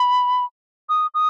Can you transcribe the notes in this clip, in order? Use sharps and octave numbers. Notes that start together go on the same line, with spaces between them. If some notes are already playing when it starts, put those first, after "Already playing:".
Already playing: B5
D#6
D#6